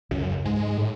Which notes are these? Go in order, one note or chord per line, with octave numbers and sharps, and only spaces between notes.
C#2 F#2
G#2 G#3
A2